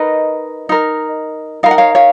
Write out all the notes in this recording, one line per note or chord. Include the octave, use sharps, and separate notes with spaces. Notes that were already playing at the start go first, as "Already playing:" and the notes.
Already playing: D#4 A#4 B4 D#5
D#4 A#4
D#4 A#4 F5
F#5
C#5 F5
C#5 F5